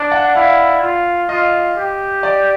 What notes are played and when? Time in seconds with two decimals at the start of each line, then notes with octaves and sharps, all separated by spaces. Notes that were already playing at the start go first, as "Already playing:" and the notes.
Already playing: D4 D5
0.12 F#5
0.35 E4 F5
0.82 F4
1.29 F4 D#5
1.77 G4
2.23 D5